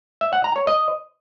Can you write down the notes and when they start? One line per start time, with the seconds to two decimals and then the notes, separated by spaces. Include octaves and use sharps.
0.21 E5
0.33 F#5
0.44 A#5
0.56 C#5
0.67 D#5